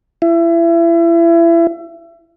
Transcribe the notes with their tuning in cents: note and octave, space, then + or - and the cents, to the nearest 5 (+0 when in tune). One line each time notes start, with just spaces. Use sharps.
E4 +30